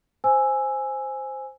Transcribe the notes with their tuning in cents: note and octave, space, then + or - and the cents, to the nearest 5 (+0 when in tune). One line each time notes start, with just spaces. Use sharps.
C5 +0 G#5 +0 E6 +0